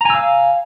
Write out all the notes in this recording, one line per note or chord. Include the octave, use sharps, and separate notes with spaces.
F5 G#5 A#5 E6